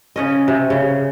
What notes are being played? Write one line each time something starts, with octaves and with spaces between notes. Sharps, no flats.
C#3 C#4 D#5
C3
C#3